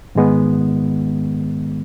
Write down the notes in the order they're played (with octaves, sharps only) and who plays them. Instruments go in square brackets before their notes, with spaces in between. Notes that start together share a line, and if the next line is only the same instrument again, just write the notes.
[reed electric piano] G#2 D#3 G#3 B3